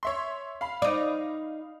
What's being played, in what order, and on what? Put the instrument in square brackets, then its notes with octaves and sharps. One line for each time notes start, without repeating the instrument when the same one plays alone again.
[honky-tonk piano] C#5 E5 C6
F5 B5
[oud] D#4 D5